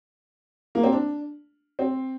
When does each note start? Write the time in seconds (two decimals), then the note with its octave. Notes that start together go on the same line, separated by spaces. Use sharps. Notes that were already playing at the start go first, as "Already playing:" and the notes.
0.75 A#3
0.83 C4
0.92 D4
1.79 C4